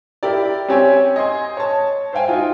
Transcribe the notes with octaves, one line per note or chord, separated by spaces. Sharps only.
E4 G4 A#4 D5
C4 C#4 G4 C#5 G#5
D#5 G#5 C6 G#6
C#5 A5
C5 E5 F5 G5 G#5
D#4 F4 F#4